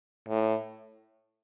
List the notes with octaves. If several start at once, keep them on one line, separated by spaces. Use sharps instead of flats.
A2